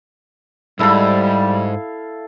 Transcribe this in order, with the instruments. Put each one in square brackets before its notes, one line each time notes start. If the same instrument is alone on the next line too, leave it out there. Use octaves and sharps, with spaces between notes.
[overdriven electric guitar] C2 G#2 [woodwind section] G3 [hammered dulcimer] E4 A4 F5